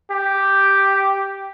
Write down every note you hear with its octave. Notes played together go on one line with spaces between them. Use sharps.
G4